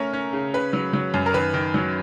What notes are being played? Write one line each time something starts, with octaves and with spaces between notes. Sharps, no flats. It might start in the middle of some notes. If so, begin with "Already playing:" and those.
Already playing: A3 C#4 A#4
C#4
C#3
C#3 B4
F#3
F#3
F#2
A#4
D#3 B4
D#3
F#3